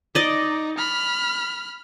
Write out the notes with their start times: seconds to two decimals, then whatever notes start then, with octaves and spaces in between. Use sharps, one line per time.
0.15 D#4 D5 D#5
0.78 B5 F6